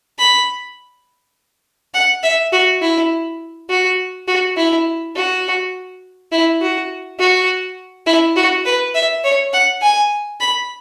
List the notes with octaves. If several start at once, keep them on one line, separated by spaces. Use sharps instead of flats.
B5
F#5
E5
F#4
E4
F#4
F#4
E4
F#4
E4
F#4
F#4
E4
F#4
B4
E5
C#5
F#5
G#5
B5